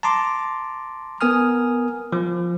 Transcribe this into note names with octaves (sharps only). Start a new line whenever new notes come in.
A5 A#5 C6 D6
B3 A#4 G#5 D#6 F6
F3